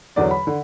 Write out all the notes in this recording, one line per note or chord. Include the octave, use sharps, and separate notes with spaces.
E2 D3 F#3 D5
B5
D3